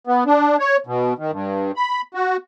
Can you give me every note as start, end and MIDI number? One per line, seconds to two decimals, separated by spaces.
0.07 0.24 59
0.27 0.56 62
0.59 0.77 73
0.87 1.14 47
1.18 1.31 51
1.32 1.72 43
1.76 2.01 83
2.14 2.37 66